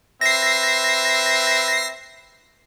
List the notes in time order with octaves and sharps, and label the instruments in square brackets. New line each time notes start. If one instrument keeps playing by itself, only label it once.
[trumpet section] C4 B4 E5 [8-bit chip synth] A#6 C7